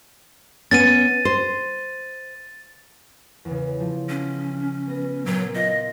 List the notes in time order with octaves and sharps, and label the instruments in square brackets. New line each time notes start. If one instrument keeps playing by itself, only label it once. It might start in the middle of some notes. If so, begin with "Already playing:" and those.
[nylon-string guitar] B3 C#4 [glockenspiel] A6 D#7
[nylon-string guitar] C5
[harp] E2 C#3
F3
[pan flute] C#4
[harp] B3 A#6
[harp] A#2 [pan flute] F#3
[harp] F4 [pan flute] D#5